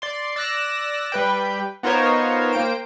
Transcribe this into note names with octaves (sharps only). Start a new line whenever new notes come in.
D5 C6
D5 E6 F#6 A#6
G3 B4 G5
B3 D#4 F4 A#4 C5 C#5
A#3 C5 G5 D7